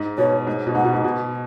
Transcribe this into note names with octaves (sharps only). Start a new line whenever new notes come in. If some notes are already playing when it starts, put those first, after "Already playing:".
Already playing: G#2
B2 C#5
G#2
B2
G#2 F#5
B2
G#2
B2